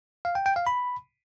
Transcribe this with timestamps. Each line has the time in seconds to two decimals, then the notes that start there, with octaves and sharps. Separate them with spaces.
0.25 F5
0.35 G5
0.46 G5
0.56 F5
0.67 B5